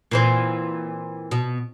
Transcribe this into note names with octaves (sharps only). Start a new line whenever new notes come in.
A#2 E3 C4
B2